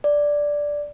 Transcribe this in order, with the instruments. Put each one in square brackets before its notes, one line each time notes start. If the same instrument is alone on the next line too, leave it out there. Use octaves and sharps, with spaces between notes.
[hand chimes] D5